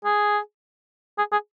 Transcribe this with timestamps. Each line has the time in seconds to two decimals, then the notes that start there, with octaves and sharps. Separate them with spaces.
0.05 G#4
1.18 G#4
1.32 G#4